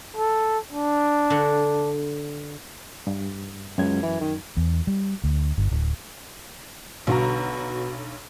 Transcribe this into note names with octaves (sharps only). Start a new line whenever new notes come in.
A4
D4
D3 F#4
G2
C#2 F#2 G#6
E3
D#3
E2
G3
D2
G1
D1
B1 B2 D3 F#4 A#5